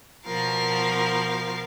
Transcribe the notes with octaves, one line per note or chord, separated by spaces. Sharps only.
B2 F3 A#4 F5